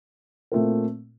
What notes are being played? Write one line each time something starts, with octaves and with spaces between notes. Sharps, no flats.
A#2 A3 C4 F4 A#4